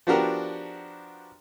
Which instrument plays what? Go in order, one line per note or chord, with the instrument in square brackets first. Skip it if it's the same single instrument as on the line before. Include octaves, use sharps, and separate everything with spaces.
[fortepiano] F3 B3 D4 F#4 G4 A#4